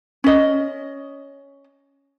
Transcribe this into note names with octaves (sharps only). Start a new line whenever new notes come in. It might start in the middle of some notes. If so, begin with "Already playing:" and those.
C#4 D#5